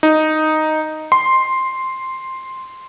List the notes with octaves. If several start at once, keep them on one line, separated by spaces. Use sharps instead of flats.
D#4
C6